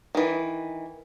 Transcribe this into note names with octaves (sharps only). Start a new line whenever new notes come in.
D#3 E3